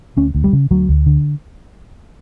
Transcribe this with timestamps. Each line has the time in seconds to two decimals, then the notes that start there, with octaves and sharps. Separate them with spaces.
0.17 D2 C#4
0.35 D2
0.44 G3
0.53 C#3
0.71 D2 F#3
0.89 D2
1.06 D3